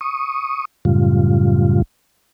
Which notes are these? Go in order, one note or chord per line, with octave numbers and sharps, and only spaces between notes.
C#6 D#6
F#2 A2 C#3 G3 F4